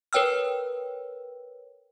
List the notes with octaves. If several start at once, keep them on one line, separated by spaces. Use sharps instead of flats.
A#4 B4 C#5 G5 E6 F6